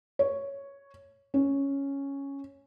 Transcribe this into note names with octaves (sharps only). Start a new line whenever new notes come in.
C#5
C#4